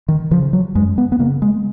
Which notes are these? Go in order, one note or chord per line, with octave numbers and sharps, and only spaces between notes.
D#3
C#3 F3
F#3
F#2 G#3
B3
B3
C#3 A#3
G#3